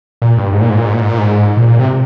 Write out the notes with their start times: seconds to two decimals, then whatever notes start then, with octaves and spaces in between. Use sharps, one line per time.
0.22 A#2
0.38 G2
0.53 G#2
0.61 A#2
0.69 G#2
0.78 A#2
0.85 G#2
0.93 A#2
1.02 G#2
1.10 A#2
1.18 G#2
1.57 A#2
1.67 A#2
1.79 C3